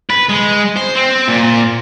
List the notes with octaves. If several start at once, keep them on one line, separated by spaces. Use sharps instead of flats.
B4
G#3
C5
C4
A#2